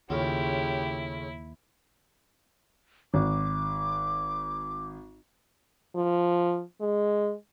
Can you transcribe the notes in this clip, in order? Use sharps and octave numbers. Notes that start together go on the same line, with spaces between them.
D#2 A2 C#3 E4 F4 G4
G#1 D6
F3
G#3